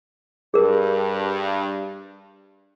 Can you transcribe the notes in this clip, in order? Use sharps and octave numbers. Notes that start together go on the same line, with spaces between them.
G2 G#4 A#4